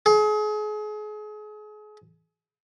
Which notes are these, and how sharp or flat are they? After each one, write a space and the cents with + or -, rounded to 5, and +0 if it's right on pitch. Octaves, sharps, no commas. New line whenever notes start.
G#4 +35